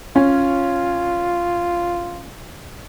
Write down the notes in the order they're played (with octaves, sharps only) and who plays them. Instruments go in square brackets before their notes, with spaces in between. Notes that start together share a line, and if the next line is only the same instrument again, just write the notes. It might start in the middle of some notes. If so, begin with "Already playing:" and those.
[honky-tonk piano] C#4 [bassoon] F4